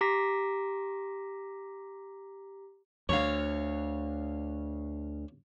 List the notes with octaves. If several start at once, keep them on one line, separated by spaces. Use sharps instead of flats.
G4 A#5 D6 A#6 B6
D2 C#5 F5